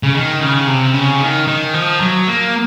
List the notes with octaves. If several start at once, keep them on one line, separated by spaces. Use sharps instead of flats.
C#3
D#3
C#3
C3
C#3
D#3
D#3
F3
F#3
A#3